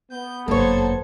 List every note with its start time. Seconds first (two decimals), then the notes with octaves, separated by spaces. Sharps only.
0.11 B3 G6
0.48 G1 F#2 A#3 A4 C5 C#5 G#6